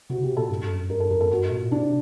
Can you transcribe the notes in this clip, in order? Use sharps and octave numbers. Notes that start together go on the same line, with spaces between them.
C3 F#4
C3 G4
A#2 A4
G2
F#2
G2 A#4
A4
F#2 A#4
A4
G2 F#4
A#2
C3 D4